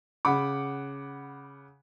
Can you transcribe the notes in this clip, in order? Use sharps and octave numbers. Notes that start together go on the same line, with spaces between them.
C#3 F#5 B5 D6